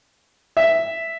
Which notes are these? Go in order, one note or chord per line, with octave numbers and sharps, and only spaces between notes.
E5